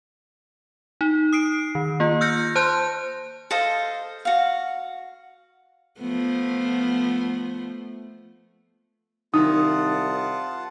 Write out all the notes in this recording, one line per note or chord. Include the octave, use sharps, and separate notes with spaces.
D#4
D#6 C7 D7
D#3
A#3 F4
E6 F6 G6 A#6 C#7
C5 A5 C6 F#6 G6
A4 C5 D#5 F5
F#4 F5
F3 A3 B3
C2 D#3 F4 F#5 A5 D#6